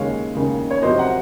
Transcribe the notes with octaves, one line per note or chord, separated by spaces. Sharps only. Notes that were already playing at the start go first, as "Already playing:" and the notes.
Already playing: D#2 C#3 G#3 C#5 F5
D#2 C#3 G#3
C#5
F2 C3 F#3 C5 D#5
F#5 A#5